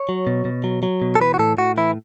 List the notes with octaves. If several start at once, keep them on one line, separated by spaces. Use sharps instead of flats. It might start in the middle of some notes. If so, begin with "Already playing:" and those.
Already playing: C#5
F#3
B2
B2
F#3
F#3
B2
A4
E3 B4
F#4
A2 A4
A2 F#4
E3 E4